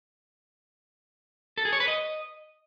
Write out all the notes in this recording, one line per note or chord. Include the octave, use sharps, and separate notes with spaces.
A4
G#4
C#5
B4
D#5